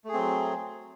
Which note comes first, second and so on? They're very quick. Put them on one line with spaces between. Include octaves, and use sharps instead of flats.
A3 G#4 C4 F#3